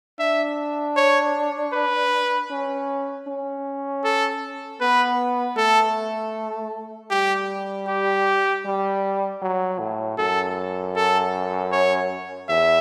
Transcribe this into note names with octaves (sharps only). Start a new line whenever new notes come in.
D4 E5
C#5
B4
C#4
C#4
A4
B3 B4
A3 A4
G3 G4
G4
G3
F#3
A2
F#2 A4
A4
C#5
E2 E5